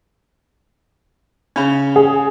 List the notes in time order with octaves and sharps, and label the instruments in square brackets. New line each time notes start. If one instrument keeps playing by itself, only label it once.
[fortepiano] C#3 C#4
[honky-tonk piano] G#4